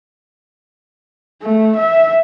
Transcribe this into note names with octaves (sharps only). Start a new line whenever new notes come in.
A3
E5